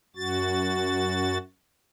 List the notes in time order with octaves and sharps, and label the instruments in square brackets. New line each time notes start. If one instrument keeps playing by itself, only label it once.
[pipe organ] F#2 F#4 A6